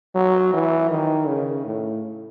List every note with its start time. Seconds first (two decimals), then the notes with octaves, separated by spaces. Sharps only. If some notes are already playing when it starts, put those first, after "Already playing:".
0.15 F#3
0.53 E3
0.91 D#3
1.28 C#3
1.66 A2